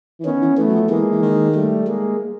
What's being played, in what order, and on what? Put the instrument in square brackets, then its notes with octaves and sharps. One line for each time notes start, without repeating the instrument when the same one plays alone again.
[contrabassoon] E3
[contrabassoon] D#3 [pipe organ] B3 C#4
[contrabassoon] E3
[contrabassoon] E3 [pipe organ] A3 B3
[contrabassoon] F#3
F3
[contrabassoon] E3 [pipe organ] G#3 A#3
[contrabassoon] E3
D#3
[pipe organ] G3 A3
G#3 A#3